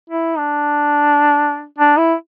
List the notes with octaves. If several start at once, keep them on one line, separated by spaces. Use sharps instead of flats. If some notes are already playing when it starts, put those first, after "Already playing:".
E4
D4
D4
E4